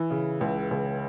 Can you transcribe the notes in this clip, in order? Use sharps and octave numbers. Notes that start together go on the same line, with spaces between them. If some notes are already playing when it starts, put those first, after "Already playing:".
Already playing: E3
C#3
C#2
C#2